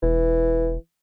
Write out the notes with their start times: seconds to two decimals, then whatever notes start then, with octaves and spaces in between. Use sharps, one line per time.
0.03 E1 E3